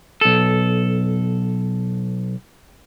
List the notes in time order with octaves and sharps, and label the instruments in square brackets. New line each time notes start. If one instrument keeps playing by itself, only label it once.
[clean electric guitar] B1 A4